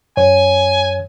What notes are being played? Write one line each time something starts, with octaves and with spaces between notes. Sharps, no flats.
F#2 C#5 G#5